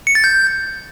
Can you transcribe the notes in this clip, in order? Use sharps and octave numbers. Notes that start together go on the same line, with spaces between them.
C#7
A6
G6